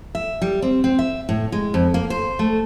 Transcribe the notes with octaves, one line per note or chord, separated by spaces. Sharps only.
E5
G3
C4
C4
E5
A2
G#3
F2
A#3
C5
A3